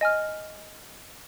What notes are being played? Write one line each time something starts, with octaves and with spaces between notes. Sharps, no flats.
D#5 G#5 F6